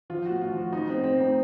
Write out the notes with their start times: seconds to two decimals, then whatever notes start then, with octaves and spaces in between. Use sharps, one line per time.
0.10 F3 F4
0.25 F#4
0.31 A2
0.42 F4
0.51 F3
0.57 F#4
0.73 F3 D#4
0.89 A2 C4
1.04 C4
1.15 A2
1.20 D#4